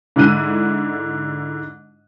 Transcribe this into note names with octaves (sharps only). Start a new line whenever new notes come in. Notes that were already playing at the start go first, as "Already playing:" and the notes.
G#2 D3 E4 F#6 D#7